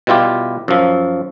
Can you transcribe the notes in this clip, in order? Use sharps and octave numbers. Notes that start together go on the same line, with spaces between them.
B2 G3 E4 F4 G4
F#2 F3